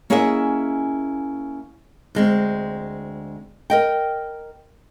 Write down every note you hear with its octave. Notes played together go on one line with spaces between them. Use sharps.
A#3 C#4 E4 G#4 D#5 E5
D2 G#3 C4
A#4 D#5 G5